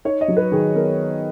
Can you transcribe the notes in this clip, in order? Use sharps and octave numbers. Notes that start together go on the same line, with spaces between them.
D#4 C#5
D#5
F#3
B4
D#3 G#4
B3 A#4